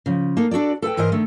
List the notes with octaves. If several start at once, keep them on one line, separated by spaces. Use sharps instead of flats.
C#3 F3
A#3 D#4 A4
D4 F#4 A4 D5
A4 B4 F#5 G5
G#2 E3 A#4 C5 D#5
D3 D#3 A3